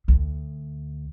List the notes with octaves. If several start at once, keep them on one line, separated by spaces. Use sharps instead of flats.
D2